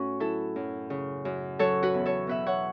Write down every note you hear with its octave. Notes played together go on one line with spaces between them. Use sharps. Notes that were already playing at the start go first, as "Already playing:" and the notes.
Already playing: A2 C#4 F#4
F#3 E4 A4
F#2
C#3
F#2
F#3 A4 C#5
F#4 B4
E2
A4 C#5
B2 B4 E5
C#5 F#5